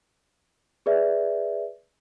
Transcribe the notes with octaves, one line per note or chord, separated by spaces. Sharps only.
G#4 B4 D5 E5